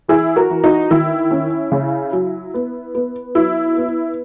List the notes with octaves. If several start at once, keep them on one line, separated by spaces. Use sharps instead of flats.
E3 E4 G#4
F#4 A#4
E3
D#4 F#4
D#3 E4
C#4
C#3
F#3
B3
B3
F#3 E4
B3